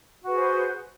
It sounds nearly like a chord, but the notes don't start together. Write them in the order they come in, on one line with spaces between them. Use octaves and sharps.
F#4 B4 G#4 C5